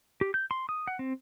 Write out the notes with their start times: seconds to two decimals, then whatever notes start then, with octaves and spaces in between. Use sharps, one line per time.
0.21 G4
0.34 G6
0.51 C6
0.69 D#6
0.87 F#5
0.99 C4